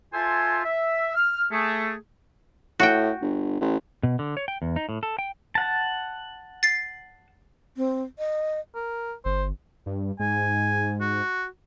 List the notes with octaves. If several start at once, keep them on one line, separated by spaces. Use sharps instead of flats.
F4 A4 C5 E5 G#5
E5
F6
A3 G#4
A2 F#4 G5
G1
A1
B2
D3
C#5
G5
E2
D#4
A2
A4
G5
F#5 A5
A6 C7
C4
D#5
A#4
G1 C5
G2
G#2 G#5
F#4